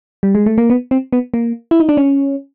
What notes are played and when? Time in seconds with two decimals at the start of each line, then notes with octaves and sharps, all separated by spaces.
0.23 G3
0.35 G#3
0.46 A3
0.58 A#3
0.70 B3
0.91 C4
1.13 B3
1.34 A#3
1.71 E4
1.80 D#4
1.89 D4
1.97 C#4